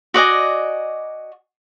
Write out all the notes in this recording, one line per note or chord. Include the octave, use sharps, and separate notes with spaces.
F#4 D5 D#5 G#5